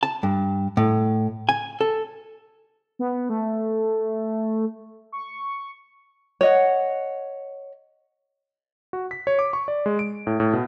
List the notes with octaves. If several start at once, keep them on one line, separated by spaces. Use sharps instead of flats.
A5
G2
A2
G#5
A4
B3
A3
C#6
C#5 D#5 F#5
F#4
B6
C#5
D6
C#6
D5
G#3
D7
A2
A2
B2